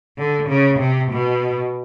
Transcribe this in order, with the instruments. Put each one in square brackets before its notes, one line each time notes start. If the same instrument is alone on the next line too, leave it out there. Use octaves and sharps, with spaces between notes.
[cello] D3
C#3
C3
B2